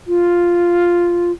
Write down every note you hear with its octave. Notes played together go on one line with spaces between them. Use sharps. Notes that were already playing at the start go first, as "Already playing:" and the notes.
F4